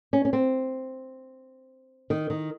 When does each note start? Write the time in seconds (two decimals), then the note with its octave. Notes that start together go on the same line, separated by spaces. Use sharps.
0.13 C#4
0.25 C#4
0.33 C4
2.10 D#3
2.30 D#3